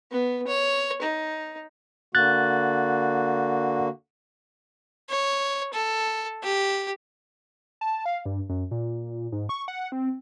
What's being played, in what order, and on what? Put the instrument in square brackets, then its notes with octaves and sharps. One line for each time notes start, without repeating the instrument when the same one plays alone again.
[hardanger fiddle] B3
C#5
D#4
[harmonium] D3 A#3 F#4 [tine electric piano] F#6 A6
[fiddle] C#5
A4
G4
[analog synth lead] A5
F5
G2
F#2
A#2
G#2
C#6
F#5
C4